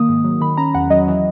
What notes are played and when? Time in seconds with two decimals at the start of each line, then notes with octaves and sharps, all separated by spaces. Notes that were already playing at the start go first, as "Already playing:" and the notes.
Already playing: D#3 A#3 D#6
0.09 G#2
0.24 F#3
0.41 D#3 B5
0.57 C#4 A#5
0.75 E2 F#5
0.90 F#3 D#5
1.08 E3